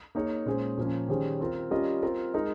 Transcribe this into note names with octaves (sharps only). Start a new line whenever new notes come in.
A#3 D#4 G#4 C#5
A#2 G#3 C#4 G#4 C5
A#2 F3 A#3 C#4
D#3 G3 C#4 G#4 C5
C4 F4 A#4
G3 C#4 F4 A#4 D#5
C4 F4 A#4
G#3 D#4 A#4 D#5